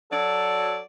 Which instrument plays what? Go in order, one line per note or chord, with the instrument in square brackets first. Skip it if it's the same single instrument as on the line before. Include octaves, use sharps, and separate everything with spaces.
[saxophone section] F#3 D5 [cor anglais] A4